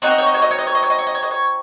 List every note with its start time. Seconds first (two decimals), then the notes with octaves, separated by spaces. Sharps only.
0.02 C4 D#4 F#4 C#5
0.10 D#5
0.18 C#5
0.27 D#5
0.34 C#5
0.42 D#5
0.51 C#5
0.59 D#5
0.67 C#5
0.75 D#5
0.83 C#5
0.90 D#5
0.99 C#5
1.07 D#5
1.14 C#5
1.23 D#5
1.31 C#5